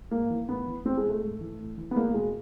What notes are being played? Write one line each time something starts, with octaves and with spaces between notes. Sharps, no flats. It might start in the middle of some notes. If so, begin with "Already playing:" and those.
G#2 A#3
E3
A2 B3
E3
E2 C4
G#3
B2
A3
G#2
E3
A2
E3
B3
E2 A#3
B2 G#3